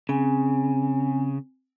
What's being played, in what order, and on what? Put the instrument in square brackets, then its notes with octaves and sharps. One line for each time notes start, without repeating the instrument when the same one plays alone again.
[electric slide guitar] C#3 [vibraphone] C4 G#5